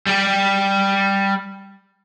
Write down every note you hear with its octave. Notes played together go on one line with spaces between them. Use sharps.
G3 G4